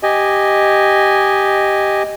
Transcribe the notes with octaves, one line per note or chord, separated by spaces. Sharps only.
G4 D#5 G#5